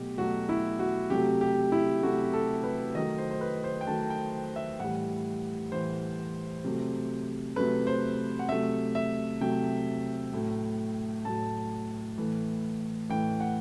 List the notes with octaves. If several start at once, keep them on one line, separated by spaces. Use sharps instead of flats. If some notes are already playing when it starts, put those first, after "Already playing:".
Already playing: B2 F#3 A3 G4
B2 F#3 A3 F#4
E4
F#4
C3 F#3 A3 G4
G4
E4
C3 F#3 A3 F#4
A4
B4
D#3 F#3 A3 D#5
C5
C5
B4
C5
G5
D#3 F#3 A3 A5
G5
E5
A2 E3 G3 F#5
A2 E3 G3 C5
C3 F#3 A3
C3 F#3 A3 B4
C5
F#5
C3 F#3 A3 E5
E5
C3 F#3 A3 G5
A2 F#3 A3
A2 F#3 A3 A5
A2 E3 A3
A2 E3 A3 G5
F#5